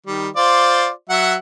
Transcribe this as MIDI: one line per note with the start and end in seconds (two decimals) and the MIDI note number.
0.06 0.29 51
0.06 0.29 55
0.36 0.89 65
0.36 0.89 72
0.36 0.89 74
1.10 1.35 54
1.10 1.35 76
1.10 1.35 78